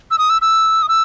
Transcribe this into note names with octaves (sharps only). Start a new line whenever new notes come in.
E6
D#6
E6
E6
D#6
E6